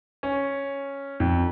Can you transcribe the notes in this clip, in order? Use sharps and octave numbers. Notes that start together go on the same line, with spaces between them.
C#4
F2